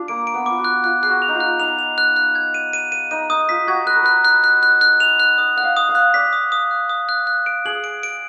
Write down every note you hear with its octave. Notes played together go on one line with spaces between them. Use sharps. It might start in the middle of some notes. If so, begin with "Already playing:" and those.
Already playing: D4 F4
A#3 D7
D7
B3
F4 D6
F#4
F#6
F4 F#6
G#4 F#6
F#4
F7
D#4
F4
F#6
D#4 F7
F7
F#6
F#6
G#6
D#7
D#7
D#7
D#4 D#7
D#4 D#6
F4 B6
F#4 G#6
B4 F#6
A#4
B4 F#6
F#6
F#6
F#6
F#6
F7
F#6
D#5 D#6
F#5 F#6
F5
D#6
F5
F#6
D5 B6
D#6
D#6
F#6
D#6
F#6
F#6
D7
G#4 F#7
D7
D7